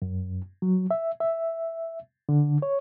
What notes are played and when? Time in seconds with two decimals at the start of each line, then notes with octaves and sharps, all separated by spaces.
0.02 F#2
0.62 F#3
0.91 E5
1.20 E5
2.29 D3
2.62 C#5